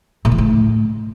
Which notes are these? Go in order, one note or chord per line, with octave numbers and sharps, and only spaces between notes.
A#2
E3
A2